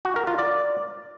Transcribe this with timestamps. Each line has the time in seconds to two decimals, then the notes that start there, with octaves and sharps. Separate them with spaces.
0.05 F#4
0.16 A#4
0.27 F4
0.38 D5